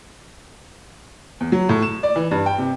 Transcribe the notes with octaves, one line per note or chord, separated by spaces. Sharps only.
E2
F#3
A2
E7
D5
E3
G2
G5
C3